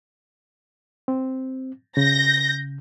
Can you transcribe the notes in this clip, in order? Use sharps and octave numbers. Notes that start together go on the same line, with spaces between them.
C4
C#3 G6 A#6